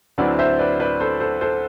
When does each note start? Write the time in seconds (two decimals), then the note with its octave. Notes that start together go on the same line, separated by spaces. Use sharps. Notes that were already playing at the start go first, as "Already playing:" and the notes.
0.18 D2 D3 F#3 C4 E4 B4 D5
0.39 C5 E5
0.59 B4 D5
0.80 B4 D5
1.00 A4 C5
1.20 A4 C5
1.41 A4 C5